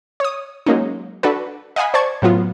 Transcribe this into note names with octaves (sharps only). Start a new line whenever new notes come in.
C#5 D#6
F#3 G#3 A#3 C#4 D#4
D4 F#4 A4 B4
D#5 F5 F#5 G#5 B5
C5 D5 A5 C#6 G#6
A2 F#3 B3 F4